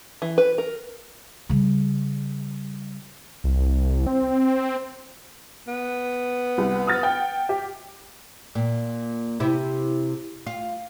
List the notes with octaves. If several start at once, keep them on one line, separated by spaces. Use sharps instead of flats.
E3
B4
A#4
C#3 G3
C2
C4
B3
C2
D#6 F6 A6
F#5 G5
G4
A#2
C3 E4
F4